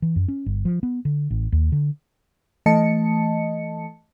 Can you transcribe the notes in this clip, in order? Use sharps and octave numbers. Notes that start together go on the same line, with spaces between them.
E3
F#2
C#4
G1
F3
B3
D3
A1
D#2
D3
E3 A3 D#5 A5 C#7